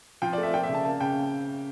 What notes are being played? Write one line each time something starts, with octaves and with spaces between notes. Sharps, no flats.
F3 G5
D5
A3
E5
A#3 G5
E5
C#3
A5
A#3 A5
C#3 G5